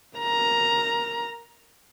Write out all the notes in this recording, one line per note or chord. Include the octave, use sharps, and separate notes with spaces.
A#4 A#5